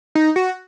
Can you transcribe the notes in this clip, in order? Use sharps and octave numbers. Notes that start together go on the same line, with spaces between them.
D#4
F#4